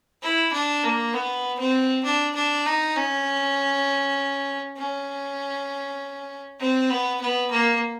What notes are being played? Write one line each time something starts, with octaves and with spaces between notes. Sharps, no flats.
E4
D4
A#3
B3
C4
D4
D4
D#4
C#4
C#4
C4
B3
B3
A#3